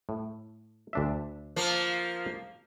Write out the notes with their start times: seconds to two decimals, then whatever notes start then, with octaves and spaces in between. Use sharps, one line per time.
0.09 A2
0.93 D2 D4 E5
1.56 F3 A#3